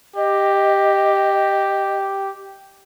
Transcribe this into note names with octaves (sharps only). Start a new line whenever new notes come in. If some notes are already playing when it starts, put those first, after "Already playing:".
G4 D#5